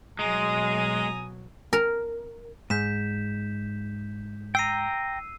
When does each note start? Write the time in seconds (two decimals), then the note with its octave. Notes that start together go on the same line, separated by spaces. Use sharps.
0.19 B2 F#3 G#3 G#4 G#5 A#5 D#6
1.73 A#4
2.70 G#2 G6 B6 E7
4.55 G5 A#5 E6 C7 D#7